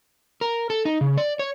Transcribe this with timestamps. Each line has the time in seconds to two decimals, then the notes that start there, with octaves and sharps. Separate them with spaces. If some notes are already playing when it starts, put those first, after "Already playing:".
0.41 A#4
0.70 A4
0.85 D#4
1.01 C#3
1.17 D5
1.39 C#5